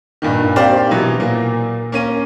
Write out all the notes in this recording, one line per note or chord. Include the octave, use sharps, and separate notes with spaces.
G2 A#2 D#3
A#3 C4 G4 C5 D5 F5
B2 E3 F#3
A#2 A#3
A#3 C#4 D#7